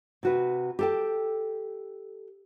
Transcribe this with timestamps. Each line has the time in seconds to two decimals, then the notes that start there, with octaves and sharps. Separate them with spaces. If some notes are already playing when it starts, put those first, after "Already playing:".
0.23 C3 F#4 B4
0.79 G4 A4 G5